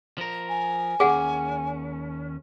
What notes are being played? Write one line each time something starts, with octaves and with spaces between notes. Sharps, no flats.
F3 A#4
G#5
D#2 C#4 G#4 F#5